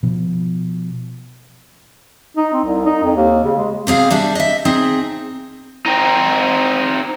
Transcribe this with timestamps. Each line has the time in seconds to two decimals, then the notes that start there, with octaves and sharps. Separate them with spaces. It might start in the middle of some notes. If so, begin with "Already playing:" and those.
0.03 B2 F3
2.37 D#4
2.53 C4
2.65 C2
2.85 D#4
3.04 F2
3.16 D#2
3.44 C#3
3.57 G#3
3.87 C3 C4 G#4 F5
4.11 G3 D4 E5
4.35 D#5 E5
4.65 C4 D#4 G#4
5.86 C4 D#4